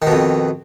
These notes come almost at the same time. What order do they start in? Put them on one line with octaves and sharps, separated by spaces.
D#3 B2 F2